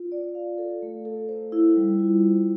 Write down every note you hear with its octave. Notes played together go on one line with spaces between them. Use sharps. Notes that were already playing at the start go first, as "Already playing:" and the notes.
Already playing: F4
D5
F5
A4
A3
A4
C5
E4
G3
F4
C5